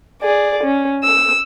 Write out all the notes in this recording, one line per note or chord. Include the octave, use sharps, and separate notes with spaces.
G#4 D5
C#4
E6